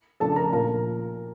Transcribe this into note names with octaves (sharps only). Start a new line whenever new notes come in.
C#3 F3 A3 D4 A4 A5
A5
A#4 A#5
A#2 F3 A#3 A#4 A#5